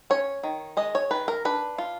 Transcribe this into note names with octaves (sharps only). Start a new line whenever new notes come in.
C#4 C#5
D#3
G#3 D#5
C#5
D#3 B4
A#4
D4 B4
F4